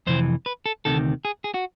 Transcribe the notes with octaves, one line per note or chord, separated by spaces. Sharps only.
F2 C3 E3 C5
B4
A4
D2 C3 D#3 A4
G#4
G#4
F#4